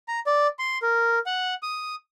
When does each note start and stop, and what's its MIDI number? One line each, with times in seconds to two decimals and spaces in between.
0.08 0.20 82
0.27 0.47 74
0.59 0.78 84
0.82 1.19 70
1.26 1.54 78
1.63 1.95 87